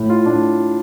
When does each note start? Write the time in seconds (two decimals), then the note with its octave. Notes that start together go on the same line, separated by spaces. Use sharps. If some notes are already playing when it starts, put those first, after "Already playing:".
Already playing: A2
0.09 F4
0.26 A2 D4